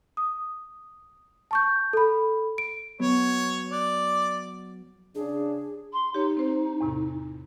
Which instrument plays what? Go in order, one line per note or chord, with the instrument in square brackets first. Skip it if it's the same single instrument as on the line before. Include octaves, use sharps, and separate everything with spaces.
[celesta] D#6
A5 C#6 G6
A4 B5
D7
[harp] F#3 B3 [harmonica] C#5
[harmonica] D5 [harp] F#6
[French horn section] C#3 D4 [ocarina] G#4
[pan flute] C6
[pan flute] D#4 [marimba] G4 C#5
[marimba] C4 C5
E2 A2 C3